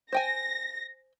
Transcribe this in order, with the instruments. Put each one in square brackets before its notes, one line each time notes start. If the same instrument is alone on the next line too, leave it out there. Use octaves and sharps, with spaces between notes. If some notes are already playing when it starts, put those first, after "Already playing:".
[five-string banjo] C5 G5 G#5 [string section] A#6